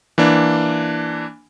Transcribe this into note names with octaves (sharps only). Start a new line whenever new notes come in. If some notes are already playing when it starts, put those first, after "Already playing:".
E3 A#3 D4